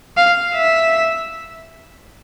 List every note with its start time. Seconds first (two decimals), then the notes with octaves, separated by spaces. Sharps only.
0.17 F5
0.55 E5